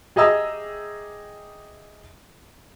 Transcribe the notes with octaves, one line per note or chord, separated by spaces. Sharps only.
G4 G#4 D#5 E5 A#5 E6